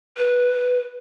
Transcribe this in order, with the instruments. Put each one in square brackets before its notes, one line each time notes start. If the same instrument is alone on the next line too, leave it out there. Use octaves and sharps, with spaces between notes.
[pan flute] B4